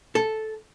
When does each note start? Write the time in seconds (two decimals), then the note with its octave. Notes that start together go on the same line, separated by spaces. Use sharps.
0.15 A4